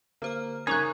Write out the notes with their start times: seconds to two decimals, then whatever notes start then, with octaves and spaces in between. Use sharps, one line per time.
0.22 D3 A#3 C5 F6
0.67 C#3 C#4 D#4 A#4 G#5 A#5 C#6 F#6